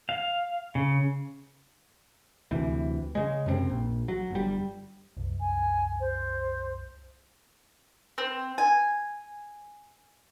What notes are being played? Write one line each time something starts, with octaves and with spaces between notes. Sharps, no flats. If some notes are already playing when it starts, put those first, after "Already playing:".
F5
C#3
D2 C3 E3
C#3 G#3
F#2 C3 A3 C4
A#1
F#3
G1 G3
C2 F#2
G#5
C5
C4
G#5